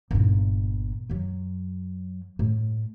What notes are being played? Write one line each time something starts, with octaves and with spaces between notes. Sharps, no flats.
G1 A#2
F#2 F#3
A2